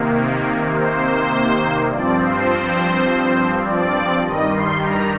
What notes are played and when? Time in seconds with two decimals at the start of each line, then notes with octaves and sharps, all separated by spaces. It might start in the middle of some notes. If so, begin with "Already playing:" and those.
Already playing: C3 D#3 A#3
0.73 C5
1.89 G2 F3 C4 D5
2.19 C5
3.64 D5
4.23 G2 D#3 G3 D#5
4.52 C6
4.82 A#5